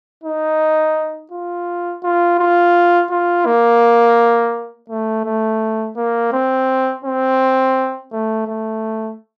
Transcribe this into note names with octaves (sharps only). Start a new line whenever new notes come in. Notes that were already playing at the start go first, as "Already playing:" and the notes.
D#4
F4
F4
F4
F4
A#3
A3
A3
A#3
C4
C4
A3
A3